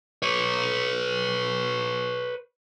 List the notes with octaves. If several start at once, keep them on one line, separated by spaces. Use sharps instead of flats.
B4 C#5